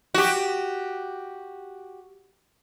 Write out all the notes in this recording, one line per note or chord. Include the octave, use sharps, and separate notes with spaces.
F#4 G4